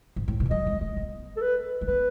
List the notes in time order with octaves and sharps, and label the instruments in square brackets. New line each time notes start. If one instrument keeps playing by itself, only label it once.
[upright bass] G#2
A2
B2
E3
[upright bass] F#3 [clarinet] D#5
[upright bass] G#3
A3
B3
[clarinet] A4
B4
[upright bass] A3
[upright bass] B3 [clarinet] B4